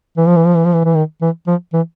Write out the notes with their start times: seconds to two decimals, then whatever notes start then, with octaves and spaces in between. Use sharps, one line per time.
0.17 E3
0.26 F3
0.36 E3
0.46 F3
0.55 E3
0.65 F3
0.73 E3
0.84 E3
0.95 D#3
1.22 E3
1.47 F3
1.73 E3